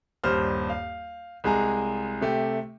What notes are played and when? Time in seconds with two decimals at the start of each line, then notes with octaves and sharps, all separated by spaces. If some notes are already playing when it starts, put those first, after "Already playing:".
0.24 D#1 G2 C5 F6
0.69 F5
1.44 C2 G#3 G#4 A#5
2.21 C3 A3 G4